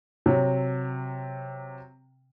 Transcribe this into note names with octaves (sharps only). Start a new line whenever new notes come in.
C3 F#3